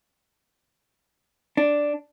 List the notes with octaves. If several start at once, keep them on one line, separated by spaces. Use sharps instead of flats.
D4